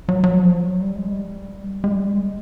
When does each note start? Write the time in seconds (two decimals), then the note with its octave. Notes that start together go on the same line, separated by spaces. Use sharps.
0.09 F#3
0.24 F#3
0.38 F3
0.60 F#3
0.81 G3
0.96 G#3
1.11 G3
1.84 G#3
1.91 G3
2.13 G#3